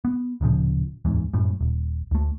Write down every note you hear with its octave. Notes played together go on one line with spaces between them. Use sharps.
B3
D1 A#2 C#3 F3
D1 E2 G#2
F#2 A2
D#1
D2 A3